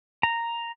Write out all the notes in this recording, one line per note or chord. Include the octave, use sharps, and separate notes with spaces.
A#5